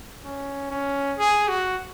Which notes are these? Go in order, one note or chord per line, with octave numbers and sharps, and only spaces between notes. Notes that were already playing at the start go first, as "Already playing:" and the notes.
C#4
C#4
G#4
F#4